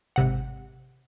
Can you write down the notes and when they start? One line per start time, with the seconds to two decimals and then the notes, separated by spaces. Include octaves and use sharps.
0.16 G#1 C3 F#5